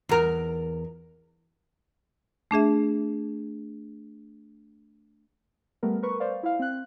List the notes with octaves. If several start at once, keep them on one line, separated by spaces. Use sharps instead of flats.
E2 A#4
A3 D4 G#4 E5
G3 A3 B3 A#4
A#4 B4 C#6
C5 D5 F5
E4 F5
C4 F#6